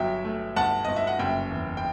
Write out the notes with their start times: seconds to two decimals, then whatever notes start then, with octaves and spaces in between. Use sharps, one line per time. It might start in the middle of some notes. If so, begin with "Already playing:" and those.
Already playing: G1 F#3 E5 G5
0.25 A3
0.56 G1 F#5 A5
0.85 G1 D#5
0.96 E5
1.07 F#5
1.19 F#1 E5 G5
1.51 E2
1.77 G5